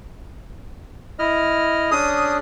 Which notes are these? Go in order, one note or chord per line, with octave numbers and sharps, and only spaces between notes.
E4 D#5 F6
C#4 D4 G#4 D#6